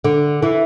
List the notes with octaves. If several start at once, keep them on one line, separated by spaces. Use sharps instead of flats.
D3
E3